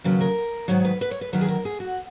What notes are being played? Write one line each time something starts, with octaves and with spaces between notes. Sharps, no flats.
D#2 C#3 F#3 B4
A#4
G#2 D#3 F#3 C#5
B4
B4
C#5
B4
E2 D#3 F#3 B4
G#4
A#4
G#4
F#4